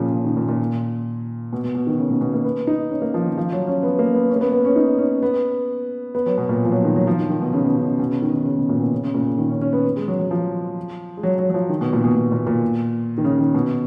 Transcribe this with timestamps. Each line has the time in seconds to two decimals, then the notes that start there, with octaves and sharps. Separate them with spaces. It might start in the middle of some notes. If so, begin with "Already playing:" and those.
Already playing: A#2 C#3 F3
0.13 C#3
0.24 D#3
0.37 A#2
0.49 A#2
1.53 B2
1.64 B2
1.75 B2
1.87 D#3
1.98 C#3
2.10 B2
2.21 B2
2.34 A#3
2.44 B3
2.67 D#4
2.91 C#4
3.02 A#3
3.14 F3
3.26 D#3
3.37 F3
3.52 F#3
3.67 C#4
3.83 B3
3.99 A#3
4.14 B3
4.29 C#4
4.36 A#3
4.41 B3
4.52 B3
4.65 C#4
4.76 D#4
4.98 C#4
5.23 B3
6.15 B3
6.26 F#3
6.38 B2
6.49 A#2
6.65 F3
6.72 F#3
6.84 D#3
6.96 F#3
7.07 F3
7.19 D#3
7.30 D#3
7.42 B2
7.53 C#3
7.65 B2
7.77 C#3
7.88 C#3
7.99 B2
8.10 C#3
8.22 D#3
8.34 D#3
8.45 C#3
8.58 B2
8.69 A#2
8.80 B2
8.92 C#3
9.03 C#3
9.14 A#2
9.27 C#3
9.38 D#3
9.49 C#4
9.61 C#4
9.73 B3
9.96 G#3
10.08 F#3
10.20 F#3
10.31 F3
11.17 G#3
11.23 F#3
11.39 F#3
11.50 F#3
11.54 F3
11.69 D#3
11.81 B2
11.93 A#2
12.04 B2
12.16 B2
12.32 A#2
12.47 A#2
13.18 D#3
13.24 C#3
13.39 D#3
13.54 B2